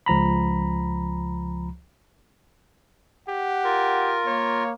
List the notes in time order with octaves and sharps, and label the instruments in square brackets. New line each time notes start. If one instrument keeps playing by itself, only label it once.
[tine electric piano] C#2 F3 A#5 B5
[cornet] G4 [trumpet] F#5
[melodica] F4 A#4
[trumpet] A#3 [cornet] C#5